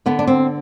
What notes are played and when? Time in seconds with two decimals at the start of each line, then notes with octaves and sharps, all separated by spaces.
0.06 D3 B3
0.19 D4
0.27 C4